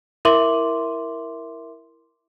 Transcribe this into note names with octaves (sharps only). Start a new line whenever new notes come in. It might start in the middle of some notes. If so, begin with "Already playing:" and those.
E4 A#4 E5 C6 D6 F#7